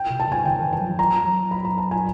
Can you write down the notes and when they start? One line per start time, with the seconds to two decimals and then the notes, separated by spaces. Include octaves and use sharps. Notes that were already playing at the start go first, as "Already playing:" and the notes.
Already playing: G5
0.10 C3
0.20 A5
0.28 C#3 G#5
0.45 D#3 G5
0.59 D#3
0.63 E3
0.73 A5
0.81 F#3
0.99 F#3 A#5
1.25 F#3
1.51 B5
1.65 A#5
1.78 A5
1.91 G#5